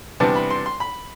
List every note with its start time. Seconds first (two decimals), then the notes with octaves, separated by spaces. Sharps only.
0.20 C3 E3 G3 B3 D4 A5
0.36 B5
0.51 C6
0.66 C6
0.80 B5